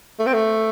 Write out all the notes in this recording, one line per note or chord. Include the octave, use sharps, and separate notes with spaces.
A3
C4
A3